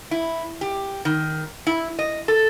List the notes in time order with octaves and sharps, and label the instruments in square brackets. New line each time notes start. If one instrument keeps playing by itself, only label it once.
[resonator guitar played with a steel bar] E4
G4
D#3
E4
D#5
A4